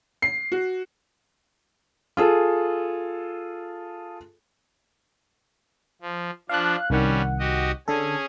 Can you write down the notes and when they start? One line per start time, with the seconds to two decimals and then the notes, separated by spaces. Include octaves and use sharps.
0.22 C7
0.52 F#4
2.17 F4 G#4 A4
6.02 F3
6.49 F3 D4 F5 F#6
6.90 C2 D#3 G3 C#4 F#5
7.39 F#4 G4 D#5
7.88 D3 C#4 G#4 A4